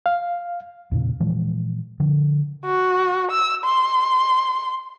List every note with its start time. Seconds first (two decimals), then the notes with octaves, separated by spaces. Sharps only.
0.06 F5
0.92 E2 A#2 C#3
1.20 A#2 E3 F3 G#3
2.00 D3 F3
2.65 F#4
3.31 E6
3.65 C6